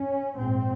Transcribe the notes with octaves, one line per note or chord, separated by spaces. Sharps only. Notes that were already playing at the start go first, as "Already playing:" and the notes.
Already playing: C#4
A#1 G#2 C4